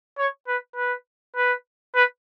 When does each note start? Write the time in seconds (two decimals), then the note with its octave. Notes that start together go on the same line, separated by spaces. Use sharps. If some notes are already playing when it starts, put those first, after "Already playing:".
0.18 C#5
0.48 B4
0.76 B4
1.36 B4
1.95 B4